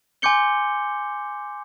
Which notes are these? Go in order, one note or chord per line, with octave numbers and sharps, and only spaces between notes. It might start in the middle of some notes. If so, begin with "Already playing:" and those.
G#5 C6 D6 G6 C#7 G7